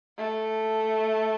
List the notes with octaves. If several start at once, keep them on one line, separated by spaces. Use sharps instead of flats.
A3